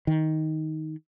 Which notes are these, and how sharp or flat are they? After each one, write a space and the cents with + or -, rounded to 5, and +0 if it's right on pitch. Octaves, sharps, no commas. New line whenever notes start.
D#3 +10